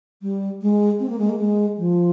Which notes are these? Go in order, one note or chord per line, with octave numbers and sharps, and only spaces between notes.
G3
G#3
C4
A#3
G#3
A#3
G#3
F3